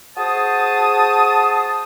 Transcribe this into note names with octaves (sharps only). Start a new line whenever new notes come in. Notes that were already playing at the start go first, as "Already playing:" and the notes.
F#4 G#4 C5 A5 D#6